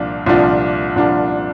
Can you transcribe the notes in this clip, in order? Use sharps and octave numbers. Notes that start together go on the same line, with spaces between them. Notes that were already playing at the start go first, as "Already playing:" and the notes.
Already playing: C2 A#2 F3 D4 F4
C2 A#2 F3 D4 F4
C2 A#2 F3 D4 F4